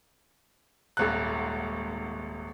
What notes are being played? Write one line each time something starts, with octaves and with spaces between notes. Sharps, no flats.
D#1 G#1 F#6